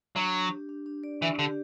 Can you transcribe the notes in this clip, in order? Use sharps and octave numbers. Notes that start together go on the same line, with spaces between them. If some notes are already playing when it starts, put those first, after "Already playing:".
F#3 D4
D4
G4
D4
D4
D5
E3 D4
D3 G4